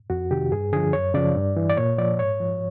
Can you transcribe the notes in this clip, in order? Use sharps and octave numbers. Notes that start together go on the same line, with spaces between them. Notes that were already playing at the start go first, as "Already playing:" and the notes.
F2 F#4
C3 D#3 G4
G2 G#4
D3 F3 G#4
F#2 C#5
C#3 F3 D5
G2
E3
D5
A#2 C#5
F3 D5
G#2 C#5
F3